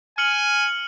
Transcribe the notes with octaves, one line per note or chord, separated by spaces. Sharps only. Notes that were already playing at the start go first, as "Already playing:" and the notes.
G#5 F6 C#7 F#7